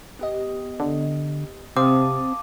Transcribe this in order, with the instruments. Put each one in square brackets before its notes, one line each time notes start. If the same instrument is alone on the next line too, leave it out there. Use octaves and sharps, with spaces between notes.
[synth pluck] B3 G4 D#5
[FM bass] D3
[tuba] C3 [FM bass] C4 [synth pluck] F5 A5 D#6 [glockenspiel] D6